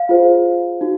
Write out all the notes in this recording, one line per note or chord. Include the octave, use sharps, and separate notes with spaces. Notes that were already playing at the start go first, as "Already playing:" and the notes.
Already playing: F5
F4 G#4 C5
D#4 F#4